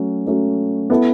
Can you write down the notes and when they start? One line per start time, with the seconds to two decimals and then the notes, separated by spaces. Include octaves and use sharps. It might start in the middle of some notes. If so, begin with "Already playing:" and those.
Already playing: F#3 A3 C#4
0.26 F#3 A3 C#4
0.90 B3 E4 A4